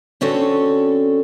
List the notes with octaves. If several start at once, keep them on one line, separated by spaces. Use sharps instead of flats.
D3 C4 C#4 F#4 A4